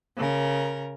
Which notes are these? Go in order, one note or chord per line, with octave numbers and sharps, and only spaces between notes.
C#3 A#4